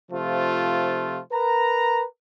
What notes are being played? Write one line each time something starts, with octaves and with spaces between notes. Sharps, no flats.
C3 F3 A3 F4
A#4 B4 A#5